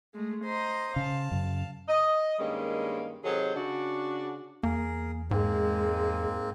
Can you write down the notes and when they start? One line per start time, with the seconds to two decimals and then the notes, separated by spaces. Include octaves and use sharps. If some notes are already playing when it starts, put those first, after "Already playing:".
0.14 G#3 A3
0.44 C5 D#5 A#5
0.96 C#3 F5 A5
1.31 F#2 C#3
1.88 D#5
2.39 G2 D#3 G3 G#3 A#3 C#4
3.24 C3 D#3 F#3 G#4 A4 C5
3.55 C#3 D4 F#4
4.63 E2 A#3 G#4 A#4
5.31 G#2 G#3 A#3 C4